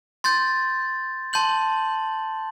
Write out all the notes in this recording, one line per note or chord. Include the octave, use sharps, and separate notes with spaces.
C6 G6 A6
A5 C6 G6 F#7